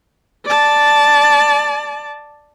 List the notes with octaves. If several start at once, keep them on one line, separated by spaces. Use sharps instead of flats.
D5 A5